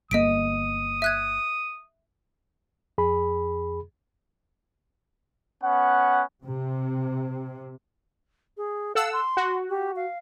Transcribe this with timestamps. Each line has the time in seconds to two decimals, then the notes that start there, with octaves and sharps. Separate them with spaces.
0.11 G1 A#3 D#5 D#6 B6 D7
1.02 E5 F#6 G#6
2.98 F2 G#4 B5
5.63 B3 C#4 F#5
6.44 C3
8.57 G#4
8.95 A4 F5 F#5 E6
9.13 C6
9.37 F#4
9.69 G4
9.96 F5